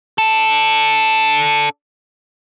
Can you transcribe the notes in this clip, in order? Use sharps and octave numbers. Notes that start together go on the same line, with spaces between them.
D4 A4